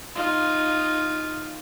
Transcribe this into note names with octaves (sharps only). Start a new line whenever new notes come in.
D#4 F4